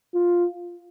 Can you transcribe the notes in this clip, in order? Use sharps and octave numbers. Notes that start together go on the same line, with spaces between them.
F4